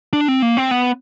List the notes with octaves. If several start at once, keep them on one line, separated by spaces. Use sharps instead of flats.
D4
C4
A#3
C4
B3